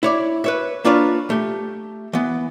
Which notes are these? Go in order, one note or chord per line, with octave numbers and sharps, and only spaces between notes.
E4 C#5 D5
B4 C#5 E5
A#3 D4 F4 B4 C#5
A3 G4
E3 B3